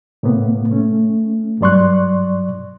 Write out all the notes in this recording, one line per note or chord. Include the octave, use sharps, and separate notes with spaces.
A2 C3 A#3 B3
A3 C#4
G2 F#3 D5 C6 C#6 F#6